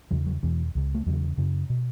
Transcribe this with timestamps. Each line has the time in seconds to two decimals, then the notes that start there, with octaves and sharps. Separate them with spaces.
0.11 E2 C#3 F#3
0.26 F#3
0.43 E2 B2 E3
0.75 C#2 C#3
0.95 A3
1.06 E2 C#3 F#3
1.37 F#2 C#3
1.70 B2